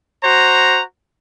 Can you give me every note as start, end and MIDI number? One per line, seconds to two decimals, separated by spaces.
0.24 0.82 66
0.24 0.82 72
0.24 0.82 82